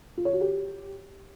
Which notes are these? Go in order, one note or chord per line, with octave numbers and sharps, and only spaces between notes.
F4
C#5
F#4
G4